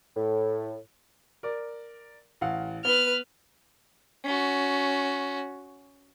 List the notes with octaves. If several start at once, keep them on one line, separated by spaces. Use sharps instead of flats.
A2
A#4 D5
A1 F5 F#5
B3 B4 F6 G7
C#4 F#4